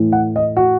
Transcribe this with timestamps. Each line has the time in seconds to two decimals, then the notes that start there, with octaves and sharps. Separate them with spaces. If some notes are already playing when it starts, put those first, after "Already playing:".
Already playing: A2 E3
0.12 F#5
0.36 D#5
0.57 F#4